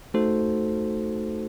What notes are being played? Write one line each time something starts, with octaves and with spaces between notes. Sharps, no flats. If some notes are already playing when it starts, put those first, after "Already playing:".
A3 D#4 F#4 A4 C5